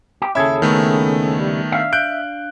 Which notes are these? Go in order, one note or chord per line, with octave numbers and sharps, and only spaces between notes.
G4
D#2 C#3 C#4 E4 G#4 A4 E5 G#6
D#3 A3 B3
G3
D4 E5 F5
F#6 G6 D7